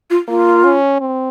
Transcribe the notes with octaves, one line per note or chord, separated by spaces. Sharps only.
F4
A#3 F4
C#4
C4